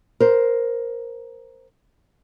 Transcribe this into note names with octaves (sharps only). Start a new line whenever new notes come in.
A#4 C5